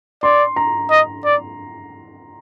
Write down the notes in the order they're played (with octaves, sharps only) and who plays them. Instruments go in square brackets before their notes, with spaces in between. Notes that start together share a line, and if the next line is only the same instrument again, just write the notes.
[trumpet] D5 [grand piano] C6
[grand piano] A#5
[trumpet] D#5
D5